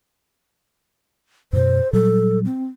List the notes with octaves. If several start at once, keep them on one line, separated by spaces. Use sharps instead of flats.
F#2 B2 C5
A#2 F#3 G3 A4
C4